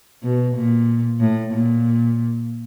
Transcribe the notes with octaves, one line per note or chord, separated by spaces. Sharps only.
B2
A#2
A2
A#2